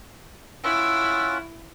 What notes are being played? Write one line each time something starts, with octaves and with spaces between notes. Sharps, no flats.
C#4 E4 F4 F#5 E6